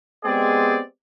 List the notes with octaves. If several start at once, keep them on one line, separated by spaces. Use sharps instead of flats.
G#3 B3 C4 G4 G#4 D5